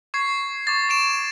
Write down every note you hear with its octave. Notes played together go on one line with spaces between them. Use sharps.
C#6 G#6 C7
C#6 D6 A6
C#6 D7 E7